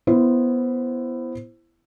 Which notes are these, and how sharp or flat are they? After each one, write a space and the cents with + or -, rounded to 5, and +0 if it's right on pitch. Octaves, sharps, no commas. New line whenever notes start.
B3 +0 E4 +15 C5 +0